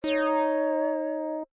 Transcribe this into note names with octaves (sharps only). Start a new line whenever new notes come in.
D#4 C#5